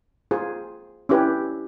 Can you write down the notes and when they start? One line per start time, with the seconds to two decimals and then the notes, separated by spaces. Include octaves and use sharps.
0.31 F4 G#4 C5
1.09 C#4 E4 G4 B4